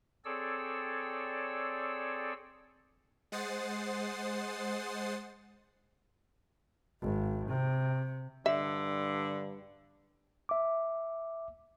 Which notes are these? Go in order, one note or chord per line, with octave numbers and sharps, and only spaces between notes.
C4 G#4 A4 C#5 D5 E6
G#3 C5 F#5 D#6 A6 C7
G#1
C3
G2 D3 E5
E5 D6